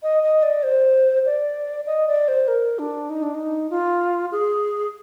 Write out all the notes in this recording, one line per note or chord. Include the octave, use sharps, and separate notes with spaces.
D#5
D#5
D5
C5
D5
D#5
D5
C5
A#4
D4
D#4
D4
D#4
F4
G#4